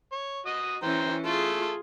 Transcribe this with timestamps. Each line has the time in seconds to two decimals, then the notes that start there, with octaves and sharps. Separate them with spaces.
0.12 C#5
0.46 F#4 D#5 D#6
0.83 E3 C#4 C5 G5 A#5
1.25 A3 F4 G#4 A4